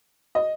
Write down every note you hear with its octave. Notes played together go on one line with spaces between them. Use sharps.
D#5